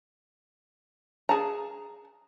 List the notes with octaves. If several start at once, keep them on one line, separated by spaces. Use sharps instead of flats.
G#4 A5 A#5